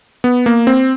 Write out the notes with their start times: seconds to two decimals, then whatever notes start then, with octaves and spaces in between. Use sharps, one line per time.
0.24 B3
0.46 A#3
0.67 C4